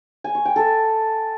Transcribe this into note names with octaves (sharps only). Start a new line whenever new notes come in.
G#5
C#6
G5
A4